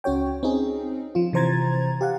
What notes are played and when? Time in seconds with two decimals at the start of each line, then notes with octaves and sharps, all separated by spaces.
0.04 C#2 C#4 F#4 C#5 G5
0.43 C4 C#4 D#4 G#4
1.15 F3 F4
1.33 C3 E3 C5 A#5 G#6 A6
2.01 G4 F5 F#5